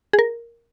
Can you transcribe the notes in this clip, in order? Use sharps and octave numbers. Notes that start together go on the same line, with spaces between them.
G#4
A#4